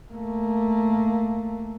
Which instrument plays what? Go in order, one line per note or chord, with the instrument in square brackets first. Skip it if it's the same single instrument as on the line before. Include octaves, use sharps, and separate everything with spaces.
[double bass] A3 A#3